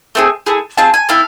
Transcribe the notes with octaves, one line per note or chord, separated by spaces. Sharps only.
A3 C4 G#4
A3 E4 G#4
C4 F4 G#4 A5
G#5
C4 E4 A4 F5